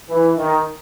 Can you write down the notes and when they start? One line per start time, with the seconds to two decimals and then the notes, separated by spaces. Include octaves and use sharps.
0.08 E3
0.37 D#3